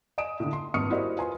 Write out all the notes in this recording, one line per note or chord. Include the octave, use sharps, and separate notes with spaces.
D#5 G#5 D#6 D7 E7
A2 D3
C6
G#1 G2 C#6 D#6 F6 C#7
E4 F#4 G4 A#4 C5 D#5
F4 B4 G#5 C6